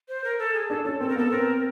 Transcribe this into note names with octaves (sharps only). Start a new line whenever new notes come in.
C5
A#4
A4
G#4
D4 A4
C#4 A4
C4 A4
A#4
B3 A4
C4 A#4